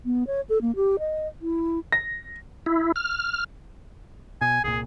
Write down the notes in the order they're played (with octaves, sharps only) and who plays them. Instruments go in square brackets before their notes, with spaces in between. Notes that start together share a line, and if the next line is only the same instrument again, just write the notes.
[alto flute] B3
C#5
A4
A#3
G4
D#5
E4
[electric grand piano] A#6
[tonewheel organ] E4
F6
[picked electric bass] B2 [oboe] G#5
[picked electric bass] C2 A#2 [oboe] G#4